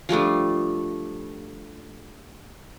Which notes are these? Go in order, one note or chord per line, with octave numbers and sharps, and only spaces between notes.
F3 G3 A3 D4